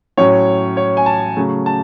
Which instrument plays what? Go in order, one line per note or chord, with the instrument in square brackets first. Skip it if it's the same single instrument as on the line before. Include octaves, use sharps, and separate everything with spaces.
[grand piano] A2 F#3 C#4 C#5
C#5
G#5
A5
C#3 F#3 A3
A5